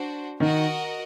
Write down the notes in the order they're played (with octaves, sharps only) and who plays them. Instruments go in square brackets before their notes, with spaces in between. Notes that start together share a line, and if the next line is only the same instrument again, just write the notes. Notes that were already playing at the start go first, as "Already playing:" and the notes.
Already playing: [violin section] D4 F#4 C5
[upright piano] D#3 [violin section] F#4 A#4 D#5 F#5